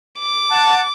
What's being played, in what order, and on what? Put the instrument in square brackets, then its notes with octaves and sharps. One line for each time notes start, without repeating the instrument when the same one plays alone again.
[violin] D6
[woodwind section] F#5 A5